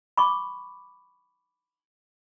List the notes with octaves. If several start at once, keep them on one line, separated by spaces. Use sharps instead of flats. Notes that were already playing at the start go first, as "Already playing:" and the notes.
B5 C#6 D6